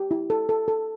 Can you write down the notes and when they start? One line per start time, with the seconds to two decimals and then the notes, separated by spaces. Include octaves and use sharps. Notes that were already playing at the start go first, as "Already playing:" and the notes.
Already playing: G4
0.11 E4
0.30 A4
0.49 A4
0.68 A4